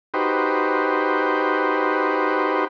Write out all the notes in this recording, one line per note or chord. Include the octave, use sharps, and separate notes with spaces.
D#4 F#4 G4 B4 C5